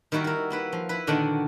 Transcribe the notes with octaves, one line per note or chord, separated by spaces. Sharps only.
D#3 G3 E4 F#4 A#4
E4 A#4
A#3 E4 B4
F3
E4 B4
A#2 D3 D#3 D4 F#4 F#5